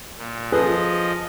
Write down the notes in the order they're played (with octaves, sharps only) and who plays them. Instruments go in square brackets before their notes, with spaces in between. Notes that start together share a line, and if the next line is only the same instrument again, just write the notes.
[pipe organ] A#2
[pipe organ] F3 D#5 [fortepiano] G#4 A4 B4